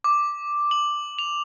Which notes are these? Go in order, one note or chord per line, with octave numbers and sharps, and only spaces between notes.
D6
F#7
F7